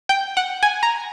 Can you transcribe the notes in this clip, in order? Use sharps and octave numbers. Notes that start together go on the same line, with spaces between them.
G5
F#5
G#5
A#5